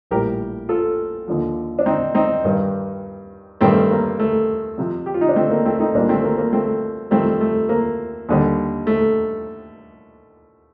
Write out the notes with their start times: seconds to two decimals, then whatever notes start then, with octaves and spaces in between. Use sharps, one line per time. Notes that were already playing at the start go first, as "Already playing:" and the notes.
0.11 A#1 A2 G3 G4 A#4
0.69 F4 A4
1.28 D#2 D3 F3
1.79 D4
1.86 C4 D#4
2.15 C4 D#4
2.44 G2 D#3 G3
3.61 G2 D#3 G3 A3 C4
3.91 A#3
4.19 A3
4.78 F2 C3 F3
5.06 G4
5.14 F4
5.21 D#4
5.29 D4
5.36 A3 C4
5.51 A#3
5.65 A3 C4
5.79 C4 D#4
5.94 C2 A#2 G3 A#3 D4
6.09 A3 C4
6.24 A#3
6.38 A#3
6.53 A3 C4
7.11 F2 D#3 G3 A3 C4
7.41 A3
7.69 A#3
8.29 D#2 D3 G3
8.87 A3